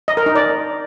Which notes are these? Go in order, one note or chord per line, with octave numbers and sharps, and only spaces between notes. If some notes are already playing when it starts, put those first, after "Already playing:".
D#5
A#4
D#4
D5